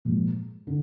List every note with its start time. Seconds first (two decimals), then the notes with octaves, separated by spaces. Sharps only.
0.05 A#2 F3 G#3
0.67 D3